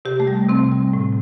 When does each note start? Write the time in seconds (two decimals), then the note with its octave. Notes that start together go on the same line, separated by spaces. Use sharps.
0.05 C3 G4
0.20 A3
0.27 G3
0.49 C3 C4
0.71 G3
0.93 A2